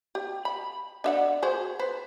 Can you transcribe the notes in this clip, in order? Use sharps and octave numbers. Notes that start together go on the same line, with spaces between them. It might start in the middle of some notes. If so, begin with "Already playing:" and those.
G4
B5
D4 E5 F#5
F#4 G#4 C5
B4 C5